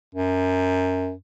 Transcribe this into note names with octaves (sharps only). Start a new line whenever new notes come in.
F#2